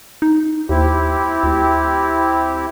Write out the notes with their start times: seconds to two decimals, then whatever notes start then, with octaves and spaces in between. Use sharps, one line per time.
0.22 D#4
0.69 D#2 C4 E4 G4
1.43 D2